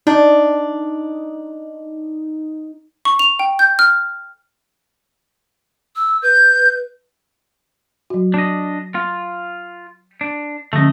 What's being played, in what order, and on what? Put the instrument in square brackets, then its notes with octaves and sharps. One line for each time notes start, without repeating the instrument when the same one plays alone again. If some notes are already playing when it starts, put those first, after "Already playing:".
[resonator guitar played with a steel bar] D4 [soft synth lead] D#4
[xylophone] C#6
F7
G5
G6
F6
[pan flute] E6
[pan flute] B4 [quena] G6
[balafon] F#3 F#4
[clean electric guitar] D4 D#5
F4
D4
[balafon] D3 F3 C#4 [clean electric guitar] A3 D#5